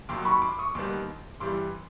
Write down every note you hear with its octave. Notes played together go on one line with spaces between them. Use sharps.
D#2 D#3 F#3 C6 D6
B5 C#6
C6 D6
C#6 D#6
D#2 D#3 G3 B3 C6 D6
G2 E3 G3 C6 D6